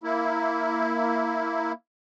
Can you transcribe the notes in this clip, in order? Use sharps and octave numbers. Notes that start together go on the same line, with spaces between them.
A#3 E4